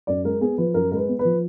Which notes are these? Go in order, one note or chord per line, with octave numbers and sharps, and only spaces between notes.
F#2 D5
G#3 A#4
B3 G#4
F3 B4
F#2 A#4
G#3 A#4 B4
B3
B4
F3